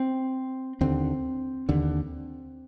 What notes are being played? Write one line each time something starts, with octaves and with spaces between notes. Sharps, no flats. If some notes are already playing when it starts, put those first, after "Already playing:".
Already playing: C4
D#2 D3 C4
D#2 D3